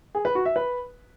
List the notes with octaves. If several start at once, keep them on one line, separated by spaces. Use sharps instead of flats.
G#4
B4
F#4
E5
B4